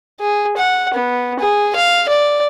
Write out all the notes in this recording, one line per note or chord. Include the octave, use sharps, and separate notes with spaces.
G#4
F#5
B3
G#4
F5
D5